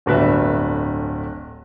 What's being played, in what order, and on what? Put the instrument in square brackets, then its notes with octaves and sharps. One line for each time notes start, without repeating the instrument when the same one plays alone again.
[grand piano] D1 G1 B4 E5